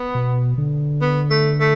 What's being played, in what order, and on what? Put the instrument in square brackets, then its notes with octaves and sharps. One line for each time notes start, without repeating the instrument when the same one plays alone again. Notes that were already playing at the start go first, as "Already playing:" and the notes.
Already playing: [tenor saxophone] B3
[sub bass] B2
D3
[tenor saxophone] B3
A3
A3